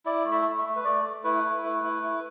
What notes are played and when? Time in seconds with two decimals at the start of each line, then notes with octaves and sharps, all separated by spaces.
0.05 E4 D5
0.25 A3
0.32 E5
0.46 A3
0.58 E5
0.65 A3
0.76 B4
0.84 A3 D5
1.04 A3
1.24 E4 B4
1.44 E4
1.64 A3 B4
1.84 E4
2.03 E4